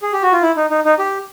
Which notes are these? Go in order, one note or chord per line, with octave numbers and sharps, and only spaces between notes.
G#4
G4
F#4
F4
E4
D#4
D#4
D#4
G4